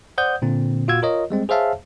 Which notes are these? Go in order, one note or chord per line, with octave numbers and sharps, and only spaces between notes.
C5 D5 F#5 D#6 G6
A#2 D3 C4
A#2 F4 F#4 F5 E6 G#6
F4 A#4 C#5 D#5
G3 G#3 C4
G#4 C5 C#5 E5 F5 A5